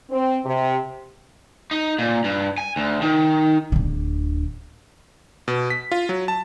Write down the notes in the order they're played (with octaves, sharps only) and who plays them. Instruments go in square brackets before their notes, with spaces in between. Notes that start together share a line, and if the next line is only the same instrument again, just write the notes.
[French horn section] C4
C3
[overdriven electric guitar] D#4
A#2
G2
G#5
D2
D#3
[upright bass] D1 D3
[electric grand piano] B2
B6
F4
F#3
A5